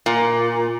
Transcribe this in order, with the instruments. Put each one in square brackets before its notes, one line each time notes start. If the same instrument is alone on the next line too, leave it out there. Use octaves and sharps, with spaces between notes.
[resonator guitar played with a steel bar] A#2